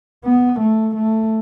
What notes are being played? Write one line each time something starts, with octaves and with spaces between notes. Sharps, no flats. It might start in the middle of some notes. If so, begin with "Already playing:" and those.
B3
A3
A3